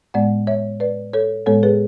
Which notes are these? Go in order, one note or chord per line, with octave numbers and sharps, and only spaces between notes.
A2 G#3 B3 D5 F#5
C#5 E5
B4 D5
A4 C#5
A2 G#3 B3 A4 C#5
G#4 B4